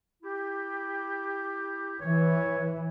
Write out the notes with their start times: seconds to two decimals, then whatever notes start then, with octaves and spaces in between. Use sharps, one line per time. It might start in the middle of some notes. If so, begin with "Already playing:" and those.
0.22 E4 G4
2.00 E3 C#5